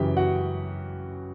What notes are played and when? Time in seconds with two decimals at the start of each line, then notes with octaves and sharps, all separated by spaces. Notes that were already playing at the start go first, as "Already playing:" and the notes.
Already playing: F#2 C#3 E3 G4 G5
0.17 F#4 F#5